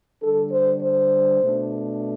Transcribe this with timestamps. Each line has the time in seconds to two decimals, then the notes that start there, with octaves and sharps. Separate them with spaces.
0.22 D3 G3 D4 A4
0.52 C5
0.82 C5
1.41 B2 A3 D4